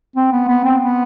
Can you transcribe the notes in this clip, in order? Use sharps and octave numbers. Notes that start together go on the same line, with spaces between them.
C4
B3
B3
C4
B3